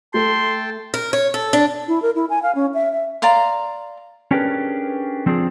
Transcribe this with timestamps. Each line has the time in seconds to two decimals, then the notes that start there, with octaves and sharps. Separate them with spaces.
0.14 A3 A4 G5 A5 C6
0.94 A#4
1.13 C#5
1.34 A4
1.53 D4
1.88 E4
2.02 A#4
2.16 E4
2.30 G#5
2.43 F5
2.55 C#4
2.74 E5
2.92 E5
3.22 D5 F5 A#5 C6
4.31 C#4 D4 G4 G#4 A#4 B4
5.26 F3 C4 D4 F4 G#4